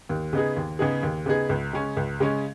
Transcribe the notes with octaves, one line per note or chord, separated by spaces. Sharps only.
D#2
C#3 B3 D#4 G#4
D#2
C#3 B3 D#4 G#4
D#2
C#3 B3 D#4 G#4
C#2
C#3 G#3 C#4
C#2
C#3 G#3 C#4